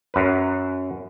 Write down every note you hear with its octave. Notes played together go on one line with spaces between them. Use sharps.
F#2 B4